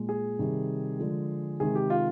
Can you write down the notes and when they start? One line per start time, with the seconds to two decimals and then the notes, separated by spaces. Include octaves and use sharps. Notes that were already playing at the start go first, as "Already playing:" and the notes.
Already playing: A#2 G#3
0.09 G#4
0.39 C3 D#3 G3
0.99 D3 F3 G#3
1.60 C3 D#3 G#3 G#4
1.75 G4
1.90 F4